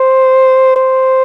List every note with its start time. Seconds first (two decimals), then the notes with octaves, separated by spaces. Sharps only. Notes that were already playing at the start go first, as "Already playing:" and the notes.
Already playing: C5
0.76 C5